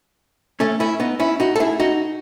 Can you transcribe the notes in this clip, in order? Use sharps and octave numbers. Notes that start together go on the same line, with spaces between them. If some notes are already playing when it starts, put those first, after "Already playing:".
A3 C#4
C#4 E4
B3 D#4
C#4 E4
D#4 F#4
A4
E4 G#4
D#4 F#4